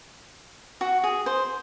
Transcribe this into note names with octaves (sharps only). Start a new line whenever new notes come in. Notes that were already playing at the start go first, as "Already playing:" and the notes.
F#4
G#4
C5